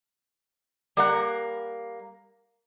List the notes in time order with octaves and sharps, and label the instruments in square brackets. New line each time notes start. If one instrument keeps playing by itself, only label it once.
[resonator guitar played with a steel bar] G3 A#3 F#5